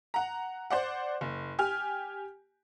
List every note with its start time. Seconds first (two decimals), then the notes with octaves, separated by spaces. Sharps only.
0.14 F#5 A#5
0.70 C5 D5 F#5
1.21 F#1
1.59 G4 G#5 F6